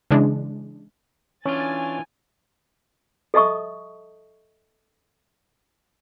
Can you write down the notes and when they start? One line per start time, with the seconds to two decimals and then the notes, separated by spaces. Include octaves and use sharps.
0.11 C#3 E3 G#3 D4
1.46 E3 C#4 D4 F4 G#5 A6
3.34 A4 D#5 E5 A5 C#6 D#6